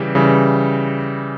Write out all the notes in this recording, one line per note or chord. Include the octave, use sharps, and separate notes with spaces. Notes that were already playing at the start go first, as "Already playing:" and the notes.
Already playing: C#3 E3 G3
C#3 E3 G3